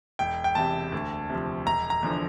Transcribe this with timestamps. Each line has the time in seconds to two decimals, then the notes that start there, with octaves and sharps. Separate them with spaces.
0.19 E1 G5
0.44 G5
0.55 E2 C3 A5
0.92 D2
1.30 C3 F3
1.66 E1 A#5
1.90 A#5
2.03 E2 D3 F3